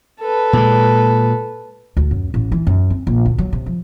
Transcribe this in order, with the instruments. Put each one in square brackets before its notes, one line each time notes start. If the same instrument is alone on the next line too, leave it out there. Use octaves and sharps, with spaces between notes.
[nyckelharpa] A4 B4
[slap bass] A#2 G#3
[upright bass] D2
F#2
A1
E3
F#2
C4
A#1
D2
F#3
C3
F3